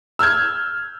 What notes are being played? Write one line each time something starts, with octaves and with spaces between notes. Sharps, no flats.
E6 F6 G6 G#6